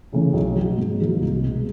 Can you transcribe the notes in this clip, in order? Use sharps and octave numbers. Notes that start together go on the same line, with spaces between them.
C#3 E3 A3 C#4
B1
B2 F#3
G#2
D#3 F#3 A#3
C2
B2 G#3